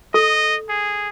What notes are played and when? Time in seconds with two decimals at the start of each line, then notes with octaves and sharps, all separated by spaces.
0.14 A4 D#5
0.69 G#4